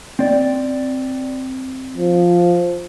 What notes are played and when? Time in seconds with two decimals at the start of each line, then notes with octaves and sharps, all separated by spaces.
0.19 C4 D5
1.98 F3